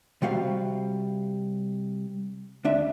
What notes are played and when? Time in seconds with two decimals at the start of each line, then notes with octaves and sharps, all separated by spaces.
0.22 C3 G3 F#4 F5
2.65 D2 D4 E5